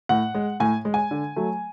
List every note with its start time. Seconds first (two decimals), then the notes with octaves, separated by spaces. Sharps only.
0.09 A2 F#5
0.35 G#3
0.60 A2 G#5
0.85 G#3
0.94 G#5
1.11 D3
1.36 F#3 A3